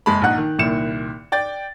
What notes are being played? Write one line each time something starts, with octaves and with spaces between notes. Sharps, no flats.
F#1 G#3 A5 B5
A#1 D#4 F#5 F#6
D#3
C2 A#2 D#3 E4 C#7 E7
D5 G5 A6